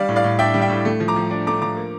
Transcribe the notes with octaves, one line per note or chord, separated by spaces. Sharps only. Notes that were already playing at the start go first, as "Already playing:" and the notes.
Already playing: G3 D5 F5
A2
D5 F5
A2
D4 E5 G5
G3
E5 G5
A2
A3
F3
A#5 D6
F3
D4
A3 A#5 D6
F3 A#5 D6
A#3